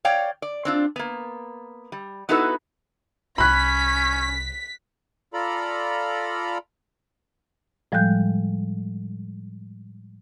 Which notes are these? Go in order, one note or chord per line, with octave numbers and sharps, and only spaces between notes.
C#5 D5 F5 G5
D5
C4 D4 F4
A#3 B3
G3
B3 D#4 E4 F#4 A4 B4
C2 C#4 B5 F#6 B6
F4 A4 D5 A#5 B5
A2 F3 G3 G#3 F#6 G6